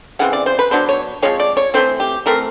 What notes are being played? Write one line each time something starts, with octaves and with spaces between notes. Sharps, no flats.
C#3 E3 C4 F#5
D5
C5
B4
F#3 B3 D4 C5
C#5
F3 G#3 C4 C#5
D5
C#5
E3 A3 C4 C5
G4
E3 A3 C4 A#4